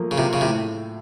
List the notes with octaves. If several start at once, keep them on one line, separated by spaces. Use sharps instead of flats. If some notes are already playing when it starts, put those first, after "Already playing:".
Already playing: F3 F#3 A3 A#3
C#3
C3 F4
C#3
A2 C3